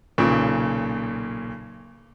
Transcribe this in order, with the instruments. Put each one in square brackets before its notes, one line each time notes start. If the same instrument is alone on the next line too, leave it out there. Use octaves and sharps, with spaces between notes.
[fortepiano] B1 A#2 C#3